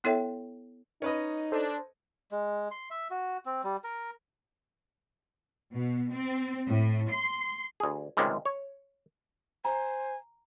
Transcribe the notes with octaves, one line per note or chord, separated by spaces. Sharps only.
B3 E4 A4 C#5 E5 G5
C#4 D#4 B4 D#5
D4 A4 C5
G#3
C6
E5
F#4
C4
G3
A#4
B2
C4
A2
C6
D2 G#4
C#2 C3 D#3 G3 G#3
C#5
C5 G#5 A#5